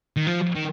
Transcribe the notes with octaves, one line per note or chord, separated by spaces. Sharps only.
D#3
F3
D#3